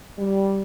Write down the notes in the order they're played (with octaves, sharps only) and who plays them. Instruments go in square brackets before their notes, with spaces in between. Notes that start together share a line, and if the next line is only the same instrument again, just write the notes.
[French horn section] G3